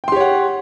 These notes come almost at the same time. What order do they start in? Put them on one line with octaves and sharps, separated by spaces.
G5 C6 G4 C#5 F#5